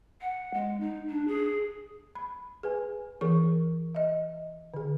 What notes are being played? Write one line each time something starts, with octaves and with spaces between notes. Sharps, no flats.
F#5
G#3
D#4
D4
G#4
B5
G#4 B4 G#5
E3 G#4 A#4 C#6
D#5 E5
D3 G#4